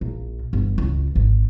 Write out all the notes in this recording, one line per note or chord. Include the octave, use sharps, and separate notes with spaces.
A#1
G1
C#2
G#1